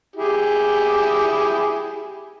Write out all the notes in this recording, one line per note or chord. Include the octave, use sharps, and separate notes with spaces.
E4 G4 G#4